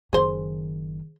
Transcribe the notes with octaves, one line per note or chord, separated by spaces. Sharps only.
F#1 D#3 G#4 C5